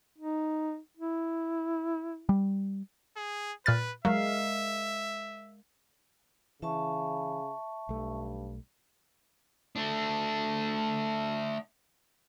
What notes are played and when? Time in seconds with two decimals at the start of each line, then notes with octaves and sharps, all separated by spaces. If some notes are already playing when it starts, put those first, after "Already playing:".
0.18 D#4
0.97 E4
2.29 G3
3.17 G#4
3.66 A#2 B4 F6 A6
4.05 F#3 G#3 A#4 E5 F5
6.62 C#3 E3 E5 A5 C#6
7.89 B1 G2 A3
9.76 A3 D4